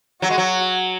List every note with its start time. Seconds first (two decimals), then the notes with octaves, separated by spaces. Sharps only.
0.22 F#3 F#4
0.30 G#3
0.38 F#3